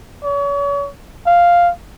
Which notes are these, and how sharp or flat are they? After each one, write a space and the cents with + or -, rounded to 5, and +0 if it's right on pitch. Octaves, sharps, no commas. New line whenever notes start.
C#5 +40
F5 +0